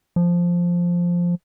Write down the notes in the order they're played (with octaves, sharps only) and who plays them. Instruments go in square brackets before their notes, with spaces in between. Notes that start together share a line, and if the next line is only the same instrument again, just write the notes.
[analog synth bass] F3